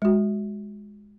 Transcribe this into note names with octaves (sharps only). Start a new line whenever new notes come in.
G#3 F#4